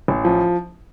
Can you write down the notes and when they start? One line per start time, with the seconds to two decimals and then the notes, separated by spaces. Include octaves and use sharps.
0.08 A1
0.25 F3